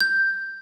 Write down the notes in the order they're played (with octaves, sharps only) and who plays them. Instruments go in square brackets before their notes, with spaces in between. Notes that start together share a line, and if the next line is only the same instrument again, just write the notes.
[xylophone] G6